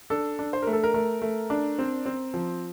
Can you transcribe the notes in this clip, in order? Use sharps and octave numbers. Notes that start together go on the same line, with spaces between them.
D4 A4
D4
C5
A3 A#4
A4
A#4
A3 A#4
A3
D4
C4
C4
F3